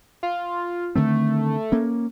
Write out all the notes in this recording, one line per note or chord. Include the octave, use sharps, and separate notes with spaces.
F4
D3 D#3 A3 C4
A#3 C#4